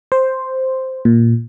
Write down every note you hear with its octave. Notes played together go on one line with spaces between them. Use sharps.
C5
A#2